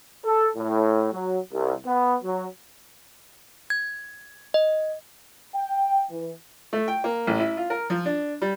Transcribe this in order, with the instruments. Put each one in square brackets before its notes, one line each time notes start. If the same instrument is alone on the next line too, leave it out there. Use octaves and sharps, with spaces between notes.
[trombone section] A4
A2
F#3
C2
B3
F#3
[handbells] G#6
D#5
[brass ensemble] G5
E3
[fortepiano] A3
G5
A#3
A1
E4
F4
A#4
F3
D4
G3